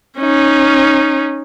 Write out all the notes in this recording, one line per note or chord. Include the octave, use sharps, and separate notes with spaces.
C#4 D#4